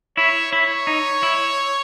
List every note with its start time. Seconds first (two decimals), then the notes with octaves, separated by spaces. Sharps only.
0.17 E4 C#5
0.52 E4 C#5
0.87 D#4
1.23 E4